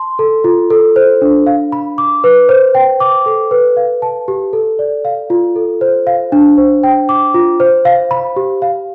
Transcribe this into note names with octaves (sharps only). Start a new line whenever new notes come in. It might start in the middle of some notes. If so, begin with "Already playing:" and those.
Already playing: A5 C6
A4
F4
A4
C5
D4
F5
B5
D6
B4
C5
G5
D6
A4
B4
F5
A5
G4
A4
D5
F5
F4
A4
C5
F5
D4
C5
G5
D6
F4
C5
F5
B5
G4
F5